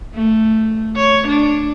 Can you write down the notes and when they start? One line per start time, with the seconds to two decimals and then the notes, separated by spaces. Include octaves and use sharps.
0.14 A3
0.96 C#5
1.27 D4